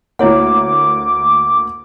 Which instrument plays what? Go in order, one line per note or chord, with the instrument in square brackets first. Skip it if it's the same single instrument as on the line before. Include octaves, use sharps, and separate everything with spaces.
[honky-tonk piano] D2 A#3 [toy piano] E4 C#5 F#5 [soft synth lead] D6